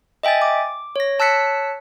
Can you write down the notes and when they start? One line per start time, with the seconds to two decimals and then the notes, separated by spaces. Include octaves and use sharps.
0.23 D#5 E5 G5 G#5 A6
0.42 D6
0.96 C#5 A#6
1.19 C#5 A5 E6 F#6 B6 C#7